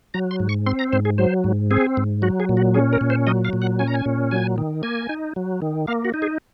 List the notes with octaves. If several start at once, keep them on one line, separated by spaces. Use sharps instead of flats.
F#3 A#5
C6
G#2
C#6
C4 C6
A#5
G#2 C5
G#4
F#3 C5
G#2
C4 G#4
G#2
F#3 F#4
G#4
A#2
F#4
C#4 G#4
A#4
A#2
C5
F#3 D#5
F5
A#2
F#5
C#4 G#5
A#5
G#5
A#2
F#3 G#5
D#3
A#3 G#5
D#4
F#3
D#3
A#3 F5
F#4
D#4
G#4